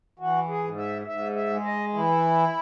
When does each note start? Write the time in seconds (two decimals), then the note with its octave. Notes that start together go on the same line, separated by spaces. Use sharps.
0.19 E3 F#4
0.49 G#4
0.64 G#2
0.78 E5
1.07 G#2 E5
1.36 E5
1.50 G#3
1.65 D#5
1.94 E3 E4